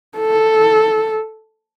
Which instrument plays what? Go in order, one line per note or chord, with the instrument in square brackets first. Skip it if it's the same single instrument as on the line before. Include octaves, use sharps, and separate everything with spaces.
[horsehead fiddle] A4